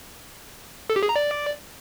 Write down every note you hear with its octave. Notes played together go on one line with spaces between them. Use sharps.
A4
G4
G#4
A#5
D5